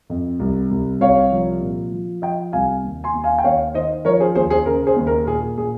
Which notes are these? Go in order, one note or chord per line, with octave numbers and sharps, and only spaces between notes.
F2
C2
C2
C2 C#5 F5
F3
A#2
F3
F3 D#5 G5
C2 F5 G#5
D#2
G#5 C6
D#2
F5 G#5
G5
D#2 C#5 F5
D#3 C5 D#5
F3 A#4 C#5
G#4 C5
D#2 G#4 C5
G#4 C5
C#3 A#4
G#4 C5
D#2
A#4
A#2 G#4
A#2 G#4